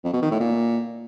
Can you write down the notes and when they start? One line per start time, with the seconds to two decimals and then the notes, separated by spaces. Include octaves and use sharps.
0.04 F2
0.13 B2
0.22 D#3
0.31 A2
0.40 A#2